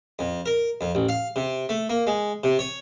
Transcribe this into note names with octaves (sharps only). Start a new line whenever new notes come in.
F2
A#4
F2
A1
F5
C3
A3
A#3
G#3
C3
C#5